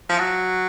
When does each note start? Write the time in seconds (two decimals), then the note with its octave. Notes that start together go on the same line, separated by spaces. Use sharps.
0.09 F3
0.19 F#3